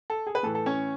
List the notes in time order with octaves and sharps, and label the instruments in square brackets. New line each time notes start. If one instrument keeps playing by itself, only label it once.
[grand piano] A4
G#4
B4
A2 E3 A4
A4
C#4 C#5